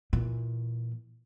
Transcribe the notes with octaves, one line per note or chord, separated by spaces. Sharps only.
A#2 E3